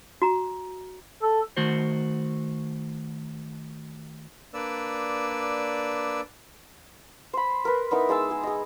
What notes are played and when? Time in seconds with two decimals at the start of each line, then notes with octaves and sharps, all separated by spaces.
0.22 F#4 A#5
1.22 A4
1.56 D#3 A3 F#4 C5
4.54 A#3 D4 B4 D5 E6
7.33 C5 B5
7.65 A#4 B4
7.91 B3 D#4 E4 A#4
8.09 G#3 D#4 A5 E6
8.31 G#4
8.43 G#4 D#5